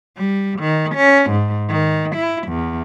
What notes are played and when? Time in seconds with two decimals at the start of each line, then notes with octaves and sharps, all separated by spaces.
0.16 G3
0.59 D#3
0.95 C#4
1.29 G#2
1.69 D#3
2.15 E4
2.47 E2